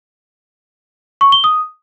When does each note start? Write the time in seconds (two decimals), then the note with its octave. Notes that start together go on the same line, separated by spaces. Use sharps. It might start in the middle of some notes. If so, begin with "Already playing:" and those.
1.21 C#6
1.32 G7
1.44 D#6